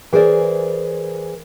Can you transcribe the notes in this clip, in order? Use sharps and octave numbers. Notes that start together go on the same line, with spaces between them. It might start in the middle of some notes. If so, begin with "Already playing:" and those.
E3 G#4 A#4 C5 D5